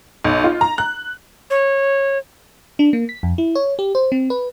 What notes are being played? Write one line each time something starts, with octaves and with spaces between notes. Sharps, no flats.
B1
F4
A#5
F#6
C#5
D4
A#3
B6
F2
E4
C#5
G4
C5
C4
B4